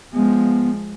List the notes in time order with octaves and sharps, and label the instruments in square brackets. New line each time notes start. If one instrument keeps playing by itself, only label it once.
[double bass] F3 G#3 [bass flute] B3